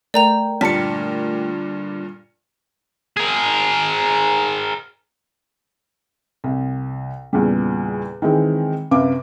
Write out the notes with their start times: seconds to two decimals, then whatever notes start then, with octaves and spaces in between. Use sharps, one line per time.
0.14 A3 A#4 D5 G5 A#5 F7
0.61 G2 A#2 D3 D5 A5 B6 C#7
3.17 G#4 A#4
6.44 C2
7.33 E2 A#2 C#3 G3
8.22 D#3 E3 G#3 C4
8.91 F#2 C3 B4 F5 D6